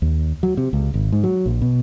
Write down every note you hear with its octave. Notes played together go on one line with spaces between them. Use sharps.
D#2
F#3
C3
C#2
G#1
G#2
F#3
A#1
B2